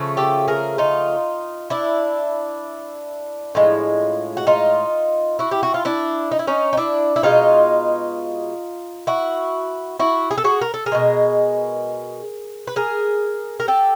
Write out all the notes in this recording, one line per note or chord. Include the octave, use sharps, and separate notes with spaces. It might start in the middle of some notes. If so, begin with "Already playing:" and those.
Already playing: C#3 F3 A3
G4 A4
G#4 A#4
D#4 F4
D4 E4
A2 F3 G#3
F#4
D#4 F4
E4 F#4
G4
F#4
F4
D4 E4
D#4
E4
C#4 D#4
D#4
D4 E4
E4
B2 G#3 D#4 F4
E4 F#4
E4 F#4
G#4
A4
F#4 G#4
A#4
A4
G#4 A#4
B2 G#3
B4
G#4 A#4
A#4
G4 A4